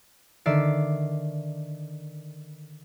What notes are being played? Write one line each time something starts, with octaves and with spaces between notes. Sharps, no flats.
D3 D#3 D5 E5 C7